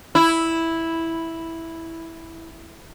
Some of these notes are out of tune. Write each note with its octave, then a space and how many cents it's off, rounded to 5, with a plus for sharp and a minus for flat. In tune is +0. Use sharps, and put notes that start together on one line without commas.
E4 -5